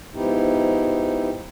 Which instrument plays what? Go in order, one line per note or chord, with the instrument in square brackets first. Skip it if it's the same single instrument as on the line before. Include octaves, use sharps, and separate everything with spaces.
[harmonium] G#2 F3 B3 D#4 E4 G4